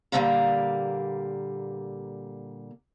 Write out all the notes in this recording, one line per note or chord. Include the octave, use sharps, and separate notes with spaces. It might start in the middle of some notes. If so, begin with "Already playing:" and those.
A#2 D3 G3 A3 A#3